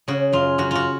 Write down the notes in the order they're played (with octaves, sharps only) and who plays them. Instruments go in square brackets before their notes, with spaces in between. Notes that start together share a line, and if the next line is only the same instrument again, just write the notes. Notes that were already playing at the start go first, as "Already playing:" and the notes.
[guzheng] C#3 F#4
F#2 F4
F#2 F#4
F4 F#4